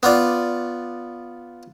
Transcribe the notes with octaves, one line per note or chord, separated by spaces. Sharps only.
B3 F4 D5